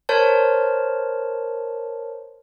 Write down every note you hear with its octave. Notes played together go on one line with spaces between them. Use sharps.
A#4 C5 C#5 A5